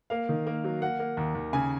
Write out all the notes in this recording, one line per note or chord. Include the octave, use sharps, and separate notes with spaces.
A#3 F5
D#3
A#3
F#3
A#3 F#5
A#3
D#2
D#2
C#3 G#5